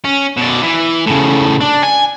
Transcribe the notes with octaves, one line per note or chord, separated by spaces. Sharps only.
C#4
B2 D5
E3
A2 C#3
D4
G#5